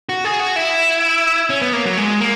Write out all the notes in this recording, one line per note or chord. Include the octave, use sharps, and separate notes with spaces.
F#4
G#4
F#4
E4
C#4
B3
A#3
F#3
G#3
A#3